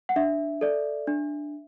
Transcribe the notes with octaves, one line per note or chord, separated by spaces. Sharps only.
F#5
D4 E5
A4 D5
D4